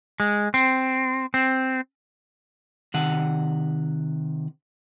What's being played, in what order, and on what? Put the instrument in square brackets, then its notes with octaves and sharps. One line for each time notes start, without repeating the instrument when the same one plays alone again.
[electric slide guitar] G#3
C4
C4
[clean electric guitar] C3 D#3 F#5